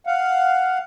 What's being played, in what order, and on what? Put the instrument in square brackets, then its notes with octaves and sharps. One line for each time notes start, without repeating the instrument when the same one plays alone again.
[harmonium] F5 F#5